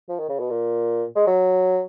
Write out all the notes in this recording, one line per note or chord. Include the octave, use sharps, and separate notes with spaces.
F3
D#3
C#3
B2
A#2
G#3
F#3